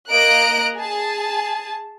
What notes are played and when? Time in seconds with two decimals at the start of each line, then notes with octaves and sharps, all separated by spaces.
0.10 A#3 D#5 A#5 F#6 D7
0.76 G#4 A5